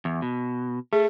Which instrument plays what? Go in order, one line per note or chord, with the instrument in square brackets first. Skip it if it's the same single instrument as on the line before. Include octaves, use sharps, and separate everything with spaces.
[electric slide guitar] E2
B2
[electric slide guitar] A3 [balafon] G#4